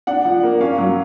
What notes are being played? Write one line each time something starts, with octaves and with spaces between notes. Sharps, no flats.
D4 F#5
F3
A#3
C#4 F5
F#3